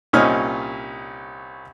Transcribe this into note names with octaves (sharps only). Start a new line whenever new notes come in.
C2 A#2 C#4 D#4 D#6 F6